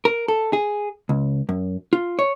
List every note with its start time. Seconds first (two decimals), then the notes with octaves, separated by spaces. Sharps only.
0.05 A#4
0.28 A4
0.53 G#4
1.09 C#2
1.49 F#2
1.93 F4
2.19 C#5